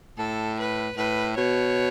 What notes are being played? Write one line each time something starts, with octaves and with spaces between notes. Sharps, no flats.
A2 A4
B4
A2 B4
B2 C#5